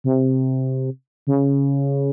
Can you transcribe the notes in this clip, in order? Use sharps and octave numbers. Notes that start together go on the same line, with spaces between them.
C3
C#3